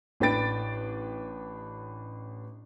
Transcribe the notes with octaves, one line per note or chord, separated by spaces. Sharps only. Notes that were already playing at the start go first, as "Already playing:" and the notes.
A1 D4 B4 G5 A6 D7